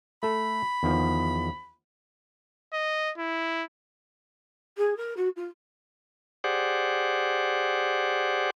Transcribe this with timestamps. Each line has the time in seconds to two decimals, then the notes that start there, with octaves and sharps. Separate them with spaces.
0.23 A3 A4 B5
0.83 E2 D#3 F3
2.73 D#5
3.18 E4
4.77 G#4
4.96 A#4
5.16 F#4
5.36 F4
6.44 G4 G#4 C5 D5 F#5